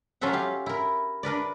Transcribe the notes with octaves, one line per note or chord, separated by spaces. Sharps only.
F#3 C#4 F4 A4 E5 F#5
G4 F5
E4 A#4
D4 A#4 B4 D5